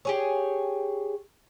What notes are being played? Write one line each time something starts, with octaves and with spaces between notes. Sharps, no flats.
G4 G#4 C#5